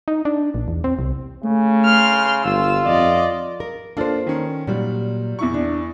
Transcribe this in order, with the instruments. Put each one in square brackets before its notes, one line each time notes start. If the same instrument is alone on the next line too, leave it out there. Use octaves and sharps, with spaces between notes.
[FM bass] D#4
D4
A#1
E2
C4
C2
[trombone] C#3 [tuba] A3
[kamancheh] C6 F6
[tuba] G1 [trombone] F4 [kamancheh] E6
[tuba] F2 [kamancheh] D5 D#5
[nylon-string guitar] A#4
[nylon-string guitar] A#3 C5 [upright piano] D4 F4 A4
[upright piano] D#3 C#4
[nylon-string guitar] A#2 [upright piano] F#3 G3
[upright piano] E2 E4 C#6
[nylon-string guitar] D4